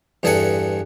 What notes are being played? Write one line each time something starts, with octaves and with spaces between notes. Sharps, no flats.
E2 G2 G#4 A4 F#5 G#5